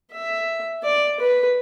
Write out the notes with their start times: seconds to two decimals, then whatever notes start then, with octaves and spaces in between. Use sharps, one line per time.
0.11 E5
0.84 D5
1.20 B4